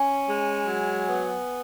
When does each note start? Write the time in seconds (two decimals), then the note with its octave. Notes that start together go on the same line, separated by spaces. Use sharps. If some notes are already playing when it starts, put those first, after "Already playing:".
Already playing: C#4 G#5
0.26 G#3
0.67 F#3
1.08 B3